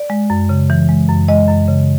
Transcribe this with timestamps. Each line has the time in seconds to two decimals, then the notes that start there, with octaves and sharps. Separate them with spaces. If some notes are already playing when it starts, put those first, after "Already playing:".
Already playing: D5
0.10 G#3
0.30 F#2
0.49 C#3
0.70 E3
0.89 G#3
1.09 F#2
1.28 G#3 D#5
1.48 F#2
1.68 C#3